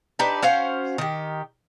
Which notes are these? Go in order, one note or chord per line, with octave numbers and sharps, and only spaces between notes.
D4 D#4 G4 B4
C#4 F#4 C5 F5
D#3 G4